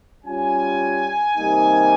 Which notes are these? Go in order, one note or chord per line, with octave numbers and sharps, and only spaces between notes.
G3 C#4 F4 G#5
C3 D#3 G3 A#3 D#4